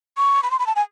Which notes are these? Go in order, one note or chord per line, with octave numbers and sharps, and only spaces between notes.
C#6
B5
C6
B5
A5
G#5